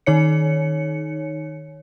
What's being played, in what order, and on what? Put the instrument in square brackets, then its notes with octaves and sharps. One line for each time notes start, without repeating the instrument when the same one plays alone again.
[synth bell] D#3 D#4 C#5 C#7